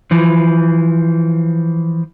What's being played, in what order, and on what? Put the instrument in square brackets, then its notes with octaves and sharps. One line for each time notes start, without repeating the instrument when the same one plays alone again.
[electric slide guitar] E3 F3